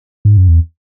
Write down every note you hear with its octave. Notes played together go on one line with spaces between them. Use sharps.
G#2
F#2
E2